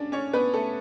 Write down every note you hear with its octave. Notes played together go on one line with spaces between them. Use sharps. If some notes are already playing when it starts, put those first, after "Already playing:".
Already playing: C#4 D4 D5
C#4 C#5
B3 B4
A3 A4